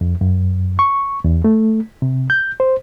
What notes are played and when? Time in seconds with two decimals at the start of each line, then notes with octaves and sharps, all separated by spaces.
0.01 F2
0.21 F#2
0.79 C#6
1.24 E2
1.44 A3
2.02 C3
2.30 G6
2.60 C5